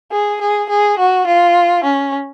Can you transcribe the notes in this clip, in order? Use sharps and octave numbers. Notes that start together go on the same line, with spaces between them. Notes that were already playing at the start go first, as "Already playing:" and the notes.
G#4
G#4
G#4
F#4
F4
C#4